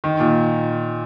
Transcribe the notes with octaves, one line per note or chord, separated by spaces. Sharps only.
D#3
A#2